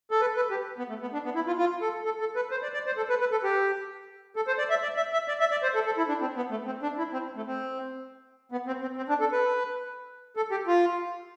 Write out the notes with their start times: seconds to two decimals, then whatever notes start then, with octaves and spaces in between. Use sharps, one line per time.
0.11 A4
0.21 B4
0.36 B4
0.51 G4
0.78 B3
0.89 A3
1.01 B3
1.13 D4
1.25 B3
1.35 E4
1.47 F4
1.58 F4
1.82 A4
2.05 A4
2.20 A4
2.36 B4
2.51 C5
2.63 D5
2.74 D5
2.86 C5
2.97 A4
3.09 B4
3.20 B4
3.31 A4
3.44 G4
4.36 A4
4.47 C5
4.58 D5
4.70 E5
4.83 D5
4.97 E5
5.13 E5
5.28 D5
5.40 E5
5.51 D5
5.63 C5
5.74 A4
5.86 A4
5.98 E4
6.08 D4
6.21 C4
6.36 B3
6.51 A3
6.66 C4
6.83 D4
6.98 E4
7.13 C4
7.36 A3
7.47 C4
8.52 B3
8.67 C4
8.82 C4
8.97 C4
9.09 D4
9.20 A4
9.32 B4
10.37 A4
10.51 G4
10.67 F4